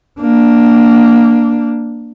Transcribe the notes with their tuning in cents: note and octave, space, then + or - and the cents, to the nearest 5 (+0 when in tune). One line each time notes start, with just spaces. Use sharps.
A#3 +0 D4 +0